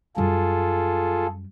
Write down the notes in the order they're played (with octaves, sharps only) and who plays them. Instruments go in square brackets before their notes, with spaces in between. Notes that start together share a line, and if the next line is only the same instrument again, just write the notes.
[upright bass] F#2 G3 [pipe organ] F4 G#4 A4